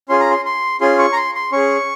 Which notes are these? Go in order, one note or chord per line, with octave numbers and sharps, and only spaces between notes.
C#4 F4 G#4 C6
A#5
C6
C6
C#4 F4 G#4 C6
C#6
A#5
C6
C6
C#4 G#4 C#6